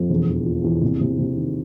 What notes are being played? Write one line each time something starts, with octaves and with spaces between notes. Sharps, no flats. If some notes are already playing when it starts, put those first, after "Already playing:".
Already playing: F2
E1
E2
F3
E2
C3
C3
C3
D#3